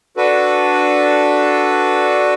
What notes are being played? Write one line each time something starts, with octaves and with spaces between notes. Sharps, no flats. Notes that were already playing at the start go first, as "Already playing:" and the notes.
D4 F#4 A4 B4